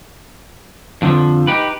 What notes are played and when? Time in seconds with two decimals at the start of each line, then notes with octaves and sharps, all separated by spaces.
1.02 F2 D3 E3 F3
1.47 D#4 G4 B4